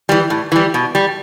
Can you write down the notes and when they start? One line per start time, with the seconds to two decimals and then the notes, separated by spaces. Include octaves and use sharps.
0.09 E3 G3
0.30 A2
0.52 E3 G3
0.74 B2
0.95 G3